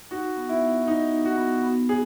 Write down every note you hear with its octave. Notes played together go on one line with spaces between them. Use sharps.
D#4 F#4
B3
E4
B3
D#4 F#4
D#4
F#4
B3
B3
F#4 G#4